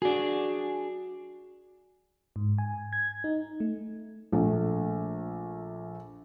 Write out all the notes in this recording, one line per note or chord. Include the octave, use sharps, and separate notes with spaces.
D4 F#4 G#4
G#2
G#5
G#6
D#4
A3
A#1 A3